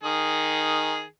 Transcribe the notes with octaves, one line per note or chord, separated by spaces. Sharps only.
D#3 G#4